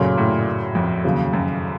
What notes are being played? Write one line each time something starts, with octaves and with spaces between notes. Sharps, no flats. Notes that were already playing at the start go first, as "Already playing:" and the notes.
Already playing: F#2 A#2 C#3 F#3 A3 C#4
A2
F2
D#2 C#3 F#3
F#2